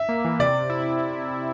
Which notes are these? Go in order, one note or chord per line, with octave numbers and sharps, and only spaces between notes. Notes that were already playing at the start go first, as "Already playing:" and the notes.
Already playing: E5
A#3
E3
C3 D5
C3
E4